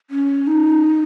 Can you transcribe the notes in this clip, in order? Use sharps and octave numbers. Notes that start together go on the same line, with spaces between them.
C#4
D#4